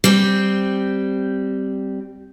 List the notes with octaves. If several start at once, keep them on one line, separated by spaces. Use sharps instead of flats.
G3 C4